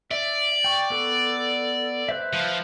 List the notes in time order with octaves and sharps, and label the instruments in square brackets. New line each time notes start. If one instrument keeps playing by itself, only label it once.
[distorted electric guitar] D5 [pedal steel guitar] E5
[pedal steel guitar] G5 C#6
B3 A4
B4 C5 E5
[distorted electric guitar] F3